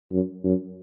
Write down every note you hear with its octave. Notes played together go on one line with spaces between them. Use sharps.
F#2
F#2